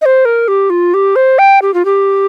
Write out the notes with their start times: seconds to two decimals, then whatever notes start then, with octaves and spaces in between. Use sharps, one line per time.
0.01 D#5
0.05 C5
0.25 A#4
0.48 G4
0.70 F4
0.94 G4
1.16 C5
1.38 G5
1.62 G4
1.74 F4
1.85 G4